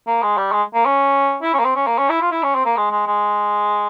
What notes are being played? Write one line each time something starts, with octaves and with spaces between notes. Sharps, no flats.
A#3
G#3
G3
G#3
A#3
C#4
E4
C#4
A#3
C4
C#4
A#3
C#4
E4
F4
E4
C#4
C4
A#3
G#3
G#3
G#3